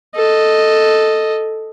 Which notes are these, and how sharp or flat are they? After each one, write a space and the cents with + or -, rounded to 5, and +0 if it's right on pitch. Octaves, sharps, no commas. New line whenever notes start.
A4 +0 D#5 +0